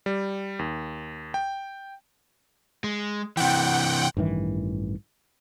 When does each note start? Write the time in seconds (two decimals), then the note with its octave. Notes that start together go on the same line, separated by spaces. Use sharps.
0.06 G3
0.59 D#2
1.34 G5
2.84 G#3
3.37 C3 E3 F#5 G5
4.17 A1 G2 D#3 E3